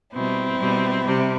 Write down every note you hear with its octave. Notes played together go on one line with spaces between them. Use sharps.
B2 G3 C4 E4
B2 G3
C3 G3